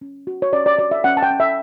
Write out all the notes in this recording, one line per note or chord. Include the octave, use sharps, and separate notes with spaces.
C#4
F#4
C#5
C#4 D5
D5
F#4 D5
E5
C#4 F#5
A5
G5
C#4
E5